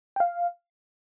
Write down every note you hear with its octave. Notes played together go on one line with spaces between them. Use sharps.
G5
F5